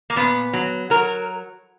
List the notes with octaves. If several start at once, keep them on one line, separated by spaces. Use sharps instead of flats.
A#3
A#2 B3
F#3
F#3 A#4